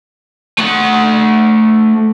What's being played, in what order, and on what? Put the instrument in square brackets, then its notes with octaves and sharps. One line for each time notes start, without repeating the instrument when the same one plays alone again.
[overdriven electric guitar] A3 F#5